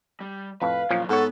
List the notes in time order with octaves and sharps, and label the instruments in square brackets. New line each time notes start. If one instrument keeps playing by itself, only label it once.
[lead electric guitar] G3
[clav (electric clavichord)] F2 A2 [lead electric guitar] B4 [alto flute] F5
[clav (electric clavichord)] A#2 F3 C#4 [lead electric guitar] F#3 A#3
[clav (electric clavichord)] G#2 C#5 [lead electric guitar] B3 [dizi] A4 [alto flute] F#5